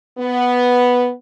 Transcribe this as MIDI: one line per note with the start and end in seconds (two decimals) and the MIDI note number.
0.19 1.09 59